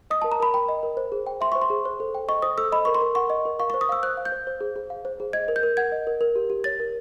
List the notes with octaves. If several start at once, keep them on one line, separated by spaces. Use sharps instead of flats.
D#5 D#6
A5
A#4
A#5
A#4 B5
G5 B5
D#5
A#4
C5
G#4
G5
E5 C6
C5 C#6
C6
G#4
C5
A4
G5
D#5 C#6
C5 D#6
A4 E6
D#5 B5
A#4 C#6
C6
A#4
F#5 C#6
D#5
A#4
F5 C#6
C#6
C5
D#6
F5 E6
C5 F#6
F5
G6
C5
C5
G#4
G#4
F5
C5
G#4
D#5 G#6
A#4
G6
A#4
F#5 G#6
D#5
A#4
A#4
G4
G4
C#5 A6
A#4